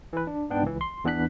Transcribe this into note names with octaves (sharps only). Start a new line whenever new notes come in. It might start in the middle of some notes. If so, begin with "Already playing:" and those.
E3 B4
D4
G#2 B3 D4 G5
C#2 E3
C6
E2 E3 B3 D4 F#6 B6